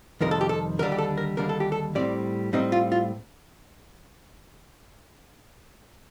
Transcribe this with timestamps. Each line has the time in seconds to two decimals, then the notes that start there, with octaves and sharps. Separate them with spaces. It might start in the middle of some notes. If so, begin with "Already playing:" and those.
0.21 F2 C3 D#3 G3 A#4
0.31 A4
0.41 G4
0.49 A4
0.79 D#2 D3 G3 D4 A#4
0.92 G4
0.98 A4
1.17 A#4
1.37 D#2 D3 G3 D4 A#4
1.49 A4
1.60 G4
1.72 A4
1.95 A2 G3 C4 D5
2.53 A2 G3 C4 D#4
2.72 F4
2.92 F4